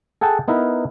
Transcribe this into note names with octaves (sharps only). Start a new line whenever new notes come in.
G#4 A4 F#5 G5 A5
B3 D#4 E4 A#4 B4